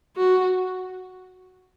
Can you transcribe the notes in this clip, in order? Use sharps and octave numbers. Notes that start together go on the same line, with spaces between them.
F#4